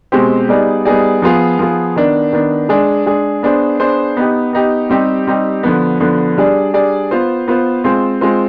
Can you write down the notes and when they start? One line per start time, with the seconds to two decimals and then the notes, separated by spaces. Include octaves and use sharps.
0.12 B2 G#3 C4 G4 C5
0.49 G3 B3 D#4 G#4 D5
0.85 G3 B3 D#4 G#4 D5
1.22 F3 B3 F4 G#4
1.59 F3 B3 F4 G#4
1.96 D#3 B3 D4
2.33 D#3 B3 D4
2.69 G#3 D4 G#4
3.06 G#3 D4 G#4
3.43 B3 D4 G#4 C5
3.80 B3 D4 G#4 C5
4.17 B3 D#4 G4
4.53 B3 D#4 G4
4.90 G3 C4 D#4 G4
5.27 G3 C4 D#4 G4
5.63 D3 F3 B3
6.00 D3 F3 B3
6.37 G3 D4 G#4 D5
6.74 G3 D4 G#4 D5
7.11 B3 F4 C5
7.48 B3 F4 C5
7.84 G#3 C4 F4 C5
8.21 G#3 C4 F4 C5